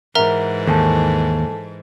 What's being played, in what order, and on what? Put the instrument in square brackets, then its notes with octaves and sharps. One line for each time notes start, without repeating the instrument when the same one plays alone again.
[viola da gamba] G#2 E3 [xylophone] A#4 E5 A#5 [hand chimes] F#5
[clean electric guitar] D#2 [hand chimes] A4 G#5 A5